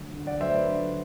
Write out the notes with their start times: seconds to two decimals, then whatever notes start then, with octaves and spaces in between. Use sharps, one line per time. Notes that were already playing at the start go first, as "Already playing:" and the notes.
Already playing: D3 F#3 A3
0.13 D3
0.27 D5 F#5
0.40 F#3 A3 C5 E5
0.54 B4 D5
0.68 D3